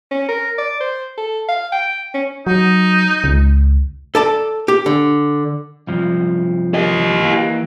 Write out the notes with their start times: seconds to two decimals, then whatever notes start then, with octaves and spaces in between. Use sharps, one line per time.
0.11 C#4
0.29 A#4
0.58 D5
0.80 C5
1.18 A4
1.49 F5
1.72 G5
2.14 C#4
2.47 F#3 D#4
3.24 C#2
4.15 A4 D5 A5
4.68 G4
4.86 D3
5.87 C2 G2 F3
6.74 G4 D#5
7.23 E3 A#3